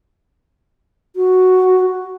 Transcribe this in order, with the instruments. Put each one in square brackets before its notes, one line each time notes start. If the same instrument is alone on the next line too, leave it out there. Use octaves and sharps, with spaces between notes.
[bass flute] F#4